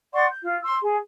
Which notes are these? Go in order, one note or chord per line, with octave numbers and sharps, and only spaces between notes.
D5 F#5 C6 C#6
G6
F4
C6 E6
G#4